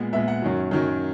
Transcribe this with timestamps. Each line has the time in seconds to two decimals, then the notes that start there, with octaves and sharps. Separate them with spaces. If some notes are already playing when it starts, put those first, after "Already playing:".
Already playing: A#2 G#3 B3
0.13 A#2 G#3 B3 E5
0.28 F#5
0.42 F#2 D#3 F#3
0.71 F#2 D#3 F#3